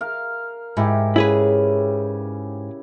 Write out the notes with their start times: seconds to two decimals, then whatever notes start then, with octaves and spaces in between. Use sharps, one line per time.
0.01 A#4 F5
0.77 G#2 E4 G4
1.16 C#3 E4 G#4 B4